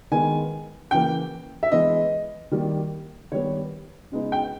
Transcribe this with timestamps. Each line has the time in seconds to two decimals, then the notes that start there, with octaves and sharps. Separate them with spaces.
0.11 D#3 G#3 B3 G#5
0.91 C#3 E3 A#3 G5
1.63 E5
1.72 E3 G#3 B3 D#5
2.51 D#3 G3 A#3
3.32 D#3 G3 B3 C#5
4.12 C#3 G#3 B3 D#4
4.32 G5